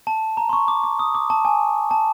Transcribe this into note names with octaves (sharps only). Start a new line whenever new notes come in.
A5
A#5
C6
C#6
D6
D6
D#6
D6
A5
G#5
A5